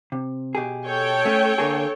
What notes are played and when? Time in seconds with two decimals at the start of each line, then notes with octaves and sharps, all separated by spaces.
0.12 C3
0.55 B2 G4 G#4
0.87 A4 C#5 G5
1.25 A3 C#4
1.58 D3 A#3 G#4